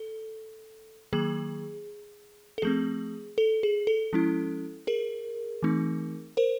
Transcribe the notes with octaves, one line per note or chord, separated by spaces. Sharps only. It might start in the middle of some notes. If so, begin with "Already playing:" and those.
Already playing: A4
D#3 F#3 A#3 G#4
A4
F3 A3 C4 G#4
A4
G#4
A4
F3 G#3 C#4 E4
G#4 A#4
E3 A3 C4 D#4
A#4 C5